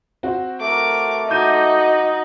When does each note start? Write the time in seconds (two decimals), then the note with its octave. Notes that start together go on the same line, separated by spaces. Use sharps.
0.23 C4 F#4
0.61 A3 A#4 D6
1.30 D#4 F#4 D#5 D6 G6 D#7